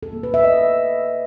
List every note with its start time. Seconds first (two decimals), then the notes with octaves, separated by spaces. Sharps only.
0.03 A4
0.13 A#3
0.23 B4
0.34 E5
0.44 D#5